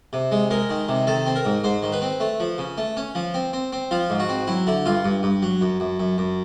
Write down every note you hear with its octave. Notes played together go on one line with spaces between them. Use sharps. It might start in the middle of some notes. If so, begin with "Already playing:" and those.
C3
G#3
G#3 A#4
D#3
C3
D#3 A4
C4
A#4
G#2
G#2 C5
D#3
B4
C4
A3
F3
C#3
A3
C#4
F3
C4
C4
C4
F3 F4
G#2
F#4
C4
F#3 E4
D3 E4
G2 F4
G2
G2
F#3
F#2
F#2
F#2
F#2